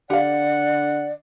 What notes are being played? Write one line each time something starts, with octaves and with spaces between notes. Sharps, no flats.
D3 G4 D5 F5 F#5